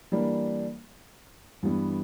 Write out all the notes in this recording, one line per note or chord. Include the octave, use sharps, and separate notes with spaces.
E3 G3 A#3 D4
G2 E3 G3 B3